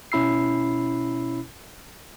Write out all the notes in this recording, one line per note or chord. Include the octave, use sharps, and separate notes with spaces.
B2 C#4 E4 B5 E6 C7